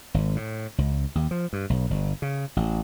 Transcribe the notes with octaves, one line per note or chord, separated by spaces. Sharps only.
G#1
A2
C#2
D#2
F3
G2
B1
G1
C#3
A1